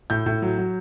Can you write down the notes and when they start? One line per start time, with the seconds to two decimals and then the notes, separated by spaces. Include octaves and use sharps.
0.10 A2 G6
0.26 A2
0.42 F#3
0.58 F#3